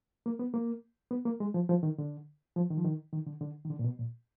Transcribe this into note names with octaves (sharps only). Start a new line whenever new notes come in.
A#3
B3
A#3
B3
A#3
G#3
F3
F3
D#3
D3
F3
D#3
F3
D#3
D#3
D3
D3
D#3
D3
A#2
B2
A#2